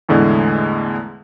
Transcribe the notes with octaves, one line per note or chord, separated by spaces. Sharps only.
E2 A2 D3 G#3 A3